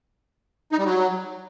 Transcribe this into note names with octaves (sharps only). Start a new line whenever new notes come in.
D#4
G3
F#3